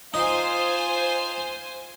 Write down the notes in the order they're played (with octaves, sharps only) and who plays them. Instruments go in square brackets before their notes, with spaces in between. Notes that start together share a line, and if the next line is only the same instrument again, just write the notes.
[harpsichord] D#4 [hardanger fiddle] F4 [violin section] C5 G#5